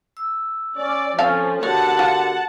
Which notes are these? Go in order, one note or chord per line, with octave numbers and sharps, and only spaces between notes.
E6
C#4 D5
F3 C4 C#4 A4 F5 A5
D3 F#4 G4 A#4 C#5 F#5 A5
F4